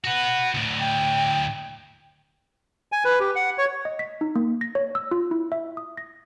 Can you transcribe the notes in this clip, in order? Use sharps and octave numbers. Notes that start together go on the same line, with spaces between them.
F#4 B4 F#5
D2 A2
G5
G#5
B4
G4
F#5
C#5
D#5
B6
D#4
A#3
A#6
C#5
E6
F4
E4
E5
D#6
A#6